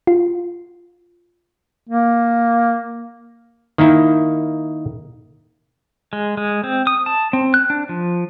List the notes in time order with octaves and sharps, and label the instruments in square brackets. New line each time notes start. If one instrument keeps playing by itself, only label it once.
[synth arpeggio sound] F4
[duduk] A#3
[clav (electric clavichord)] D#3 A#3 D#4 E4
[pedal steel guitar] G#3
G#3
C4
D#6
A5
C4
F#6
D4
F3